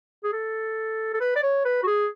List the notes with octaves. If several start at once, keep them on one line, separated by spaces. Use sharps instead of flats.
G#4
A4
A4
B4
D5
C#5
B4
F#4
G#4